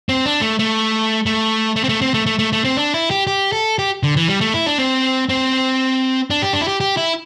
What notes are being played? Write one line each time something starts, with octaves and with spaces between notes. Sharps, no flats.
C4
D4
A3
A3
A3
A3
C4
A3
C4
A3
A3
A3
A3
C4
D4
E4
G4
G4
A4
G4
D3
E3
G3
A3
E4
D4
C4
C4
D4
G4
D4
E4
G4
G4
E4